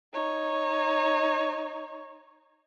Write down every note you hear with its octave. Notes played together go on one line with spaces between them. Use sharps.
D#4 C#5